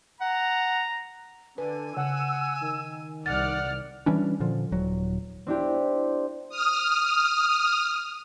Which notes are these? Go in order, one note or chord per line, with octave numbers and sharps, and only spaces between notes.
F#5 A#5
D3 B4 G#5
C#3 F#5 E6
D#3
C2 D5 F#5 F6 A6
E3 G3 C#4 D4
A#2 D3 F3
D#1 F#3
C4 D4 E4 G4
D#6 F6